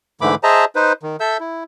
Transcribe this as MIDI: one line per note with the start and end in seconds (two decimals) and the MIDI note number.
0.21 0.35 44
0.21 0.35 50
0.21 0.35 52
0.21 0.35 57
0.21 0.35 83
0.21 0.35 86
0.43 0.65 68
0.43 0.65 72
0.43 0.65 75
0.43 0.65 76
0.43 0.65 81
0.43 0.65 82
0.75 0.93 63
0.75 0.93 71
0.75 0.93 72
1.03 1.16 51
1.20 1.37 69
1.20 1.37 76
1.20 1.37 88
1.20 1.37 91
1.40 1.64 64